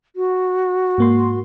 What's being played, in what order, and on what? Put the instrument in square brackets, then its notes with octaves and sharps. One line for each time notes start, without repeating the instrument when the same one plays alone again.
[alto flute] F#4
[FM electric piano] G#2 A#3 C6